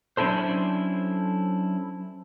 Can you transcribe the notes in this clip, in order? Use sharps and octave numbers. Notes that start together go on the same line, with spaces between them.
F#3 C#4 D4 E4 A4 C5